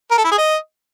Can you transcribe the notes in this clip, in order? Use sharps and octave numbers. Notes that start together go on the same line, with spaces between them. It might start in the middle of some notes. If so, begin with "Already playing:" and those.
A#4
A4
E4
G#4
D#5